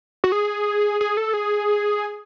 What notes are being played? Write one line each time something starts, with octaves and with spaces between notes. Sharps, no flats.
F#4
G#4
G#4
A4
G#4